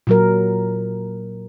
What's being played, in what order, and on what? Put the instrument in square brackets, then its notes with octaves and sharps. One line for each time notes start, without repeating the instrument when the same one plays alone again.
[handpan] A#2 F#3 A#4